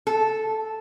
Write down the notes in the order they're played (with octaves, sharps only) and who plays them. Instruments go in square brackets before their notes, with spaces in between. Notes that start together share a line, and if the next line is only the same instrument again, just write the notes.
[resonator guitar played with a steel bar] A4